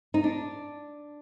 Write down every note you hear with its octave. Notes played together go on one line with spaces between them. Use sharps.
D#4
D4